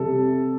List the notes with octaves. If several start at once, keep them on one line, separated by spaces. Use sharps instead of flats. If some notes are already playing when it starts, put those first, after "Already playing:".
Already playing: C3 G3 A4